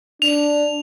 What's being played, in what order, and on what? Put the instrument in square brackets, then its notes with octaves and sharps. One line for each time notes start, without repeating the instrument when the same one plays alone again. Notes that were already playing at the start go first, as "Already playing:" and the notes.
[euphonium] D4 [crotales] F7